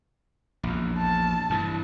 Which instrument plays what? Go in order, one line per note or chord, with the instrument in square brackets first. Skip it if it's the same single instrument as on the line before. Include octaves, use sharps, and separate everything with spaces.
[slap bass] A#1 E2
[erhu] A5
[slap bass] G2 E3